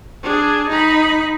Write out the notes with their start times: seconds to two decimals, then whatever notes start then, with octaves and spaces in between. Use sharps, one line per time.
0.23 D4 G#4
0.70 D#4 B5